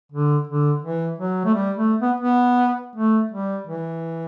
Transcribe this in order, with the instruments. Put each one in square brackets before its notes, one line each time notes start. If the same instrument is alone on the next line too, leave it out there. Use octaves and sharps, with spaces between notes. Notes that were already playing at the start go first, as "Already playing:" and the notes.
[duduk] D3
D3
E3
F#3
A3
G3
A3
B3
B3
A3
G3
E3